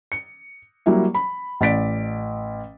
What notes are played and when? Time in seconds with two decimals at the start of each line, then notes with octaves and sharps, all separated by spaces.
0.12 C#7
0.86 F#3 G3 A#3 E4
1.15 B5
1.61 A1 D5 A6 B6 D7